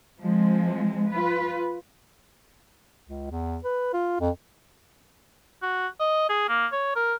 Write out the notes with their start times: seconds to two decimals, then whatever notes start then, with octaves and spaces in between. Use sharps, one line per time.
0.21 F3 G#3 C4
1.10 F4 B4
3.06 C#2
3.31 E2
3.64 B4
3.93 F4
4.21 F2
5.62 F#4
6.00 D#5
6.29 G#4
6.49 A#3
6.73 C#5
6.96 A#4